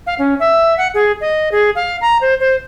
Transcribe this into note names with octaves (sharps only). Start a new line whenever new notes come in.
F5
C#4
E5
F#5
G#4
D#5
G#4
F5
A#5
C5
C5